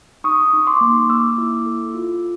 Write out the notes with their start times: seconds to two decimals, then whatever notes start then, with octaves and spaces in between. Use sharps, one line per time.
0.24 D#4 C#6 D#6
0.53 D#4
0.67 C6 D6
0.81 A#3
1.09 A#3 D6 E6
1.38 E4
1.66 A4
1.95 F4